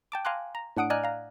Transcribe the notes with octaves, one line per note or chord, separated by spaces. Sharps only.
G5 A5 D6
F5 G#5 A#5 C6 D6 F#6
A#5
A2 D4 F#5 D#6 D7
D5 D#5 G#5 A#5 F6 F#6
F5 A#5